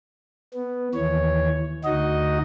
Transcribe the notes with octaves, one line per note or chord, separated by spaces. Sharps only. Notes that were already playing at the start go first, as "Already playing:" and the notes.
B3
D#2 E3 C#5
D2 D#4 F#4 D#5